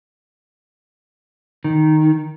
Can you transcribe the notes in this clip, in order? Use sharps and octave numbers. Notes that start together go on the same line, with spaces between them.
D#3